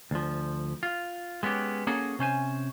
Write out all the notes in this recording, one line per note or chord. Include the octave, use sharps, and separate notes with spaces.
D2 F3
F4
G#3 B3 C#4 G4
A#3 C#4 F#4 G#4 A4
C3 C#4 C5 G#5